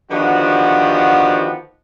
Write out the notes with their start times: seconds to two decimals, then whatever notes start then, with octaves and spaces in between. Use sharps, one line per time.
0.11 D3 D#3 F3 B3 F#4 G4